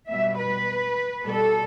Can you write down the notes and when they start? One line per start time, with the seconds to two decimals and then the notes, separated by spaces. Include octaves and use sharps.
0.11 B2 G3 E5
0.40 B4
1.25 B2 G3 A4